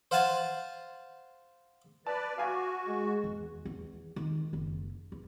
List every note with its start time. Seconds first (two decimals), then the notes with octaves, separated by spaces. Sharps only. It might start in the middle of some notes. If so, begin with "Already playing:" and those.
0.11 C5 F5 F#5 G#5 A5
2.07 B4 D5 A5
2.38 F#4 F5 G#5 D6
2.86 G#3
3.24 E2
3.65 E2
4.16 D#3
4.53 F#1
5.12 E2